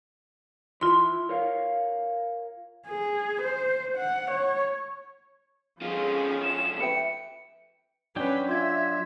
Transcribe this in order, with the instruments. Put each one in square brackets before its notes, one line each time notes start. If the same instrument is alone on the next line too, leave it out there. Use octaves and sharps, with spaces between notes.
[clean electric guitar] E3 E4 [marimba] F4 C6
[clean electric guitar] A#4 C#5 F5
[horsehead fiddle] G#4
C5
F#5
C#5
[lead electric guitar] D2 F4 [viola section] F3 C#4 G#4
[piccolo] E7
[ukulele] B4 E5 G5 [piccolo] C#7
[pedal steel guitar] F#3 D4 G5 [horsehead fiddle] C#4 B4
[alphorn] F4 [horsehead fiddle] E5 [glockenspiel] C6 G#6